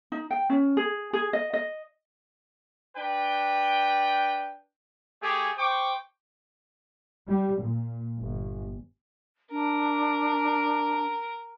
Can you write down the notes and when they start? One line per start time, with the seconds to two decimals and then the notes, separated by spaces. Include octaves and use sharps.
0.12 D#4
0.31 G5
0.50 C#4
0.77 G#4
1.13 G#4
1.33 D#5
1.53 D#5
2.97 D4 B4 G5
5.22 A3 G4 G#4
5.57 C5 G5 C#6 D6
7.28 G3
7.62 A#2
8.19 G1
9.52 D4 A#4